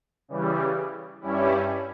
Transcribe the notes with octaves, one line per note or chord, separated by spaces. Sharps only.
C#3 E3 G3
G2 G3 C#4 E4